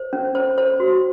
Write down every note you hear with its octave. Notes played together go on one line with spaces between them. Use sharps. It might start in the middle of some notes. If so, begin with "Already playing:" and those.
Already playing: C5
C#4
C5
C5
F#4